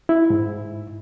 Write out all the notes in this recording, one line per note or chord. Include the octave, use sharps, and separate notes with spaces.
E4
G#2